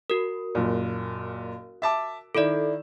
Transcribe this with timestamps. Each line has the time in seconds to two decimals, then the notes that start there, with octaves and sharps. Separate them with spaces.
0.10 F#4 A#4
0.55 F#1 A#2
1.82 E5 A5 D6
2.35 D#3 E4 A4 D5 E7